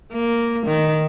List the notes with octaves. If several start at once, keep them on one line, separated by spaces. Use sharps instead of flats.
A#3
D#3